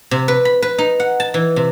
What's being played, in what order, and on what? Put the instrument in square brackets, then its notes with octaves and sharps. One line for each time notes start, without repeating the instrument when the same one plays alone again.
[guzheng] C3
B4
B5
B4
D#4
F#5
A5
E3
C3